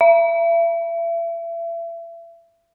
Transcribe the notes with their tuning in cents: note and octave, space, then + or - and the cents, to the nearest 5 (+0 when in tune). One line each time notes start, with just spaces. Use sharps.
E5 +35